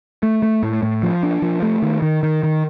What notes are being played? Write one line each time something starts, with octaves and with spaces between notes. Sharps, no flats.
A3
A3
A2
A2
F3
D4
F3
A3
D#3
D#3
D#3
D#3